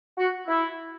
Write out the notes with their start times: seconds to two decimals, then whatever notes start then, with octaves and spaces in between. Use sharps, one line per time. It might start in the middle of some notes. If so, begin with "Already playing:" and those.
0.18 F#4
0.48 E4